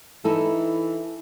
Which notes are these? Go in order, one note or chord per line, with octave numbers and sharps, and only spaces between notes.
E3 D#4 E4 A4